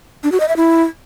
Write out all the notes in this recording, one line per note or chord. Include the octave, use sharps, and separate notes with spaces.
D4
F#4
D#5
E5
E4